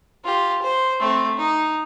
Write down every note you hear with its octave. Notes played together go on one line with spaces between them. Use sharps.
F4 G4
C5
A3 C4
D#4